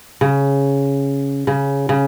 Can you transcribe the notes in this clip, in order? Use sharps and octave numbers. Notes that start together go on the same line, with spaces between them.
C#3
C#3
C#3